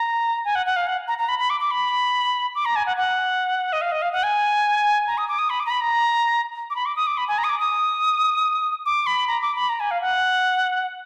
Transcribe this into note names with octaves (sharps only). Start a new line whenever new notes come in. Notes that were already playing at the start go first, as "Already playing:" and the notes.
Already playing: A#5
G#5
F#5
F#5
F5
F#5
A#5
A#5
B5
B5
D6
D6
B5
D6
A#5
G#5
F#5
F#5
D#5
F5
D#5
F5
F#5
G#5
A#5
D#6
D6
D#6
B5
D6
A#5
B5
A#5
D6
B5
D6
D#6
D6
B5
G#5
A#5
D#6
D6
D#6
D6
B5
A#5
D6
B5
A#5
G#5
F5
F#5